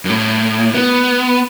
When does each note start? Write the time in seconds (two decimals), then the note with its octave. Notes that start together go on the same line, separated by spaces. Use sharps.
0.05 F#2
0.10 A2
0.74 B3